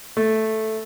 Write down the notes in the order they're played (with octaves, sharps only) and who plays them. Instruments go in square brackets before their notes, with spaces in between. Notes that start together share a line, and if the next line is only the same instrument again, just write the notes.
[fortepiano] A3